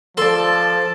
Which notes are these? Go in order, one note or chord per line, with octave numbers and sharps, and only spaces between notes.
F3 A4 D5 A5 C6